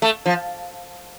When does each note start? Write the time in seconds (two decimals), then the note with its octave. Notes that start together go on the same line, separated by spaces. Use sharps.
0.02 A3
0.26 F3